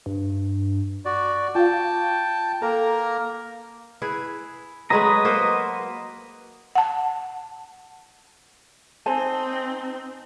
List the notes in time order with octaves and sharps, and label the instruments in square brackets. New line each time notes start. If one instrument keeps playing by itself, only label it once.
[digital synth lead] G2
[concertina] F#4 D5
[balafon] F4 F5 [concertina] G5 A5
[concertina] A#3 A#4 A#5 [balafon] A4
[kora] E4 G#4 B4
[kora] F#3 G#3 A3 [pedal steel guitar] B4 D#5 A#5
[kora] A#3 F#4 C5
[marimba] F#5 A5
[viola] C4 D#4 [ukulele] C5 G#5 A5